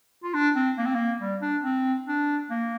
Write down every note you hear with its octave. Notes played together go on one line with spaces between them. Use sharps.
F4
D4
C4
A#3
C4
A#3
G3
D4
C4
D4
A#3